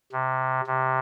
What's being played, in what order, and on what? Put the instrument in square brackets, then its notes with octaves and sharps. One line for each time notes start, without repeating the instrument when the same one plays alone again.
[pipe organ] C3
C3